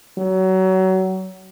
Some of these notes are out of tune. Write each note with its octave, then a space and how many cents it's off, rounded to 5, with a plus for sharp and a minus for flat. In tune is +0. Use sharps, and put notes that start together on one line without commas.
F#3 +25